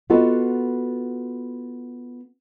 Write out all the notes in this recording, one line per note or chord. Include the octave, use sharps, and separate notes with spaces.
B3 F4 F#4 A4 D#5